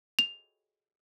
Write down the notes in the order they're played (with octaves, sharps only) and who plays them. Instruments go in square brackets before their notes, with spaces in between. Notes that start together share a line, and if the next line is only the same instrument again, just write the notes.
[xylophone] F7